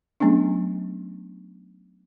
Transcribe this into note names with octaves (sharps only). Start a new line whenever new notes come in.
F#3 A3 B3 C#4 D4